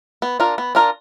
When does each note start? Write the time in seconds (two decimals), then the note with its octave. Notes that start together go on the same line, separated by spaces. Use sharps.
0.22 B3
0.40 D4 F4 A#4
0.58 B3
0.75 D4 F4 A#4